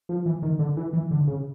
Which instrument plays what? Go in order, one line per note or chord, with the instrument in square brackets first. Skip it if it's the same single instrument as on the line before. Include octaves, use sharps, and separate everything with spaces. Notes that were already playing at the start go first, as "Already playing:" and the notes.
[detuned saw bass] F3
E3
D#3
D3
E3
E3
D3
C#3